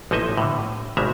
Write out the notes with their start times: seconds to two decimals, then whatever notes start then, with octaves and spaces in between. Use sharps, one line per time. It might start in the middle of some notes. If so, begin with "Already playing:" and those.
0.11 A1 F3 A#3 D#4 D#5 E5
0.37 A2 D3
0.97 G#1 B2 G3 G#3 E5 A#5